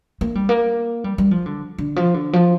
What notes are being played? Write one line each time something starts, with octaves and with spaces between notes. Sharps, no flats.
A#3
G3
A#3
G3
G3
F3
D3
D3
F3
D3
F3